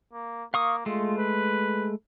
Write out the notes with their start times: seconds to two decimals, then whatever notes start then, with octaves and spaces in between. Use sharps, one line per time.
0.13 A#3
0.54 A#3 F5 C#6 D#6
0.86 G#3 A3 F4
1.18 B4